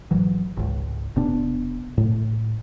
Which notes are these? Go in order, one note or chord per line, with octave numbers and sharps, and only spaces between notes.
G#1 E3 F#3
G#1 C#2
E1 C3 B3 D4
A2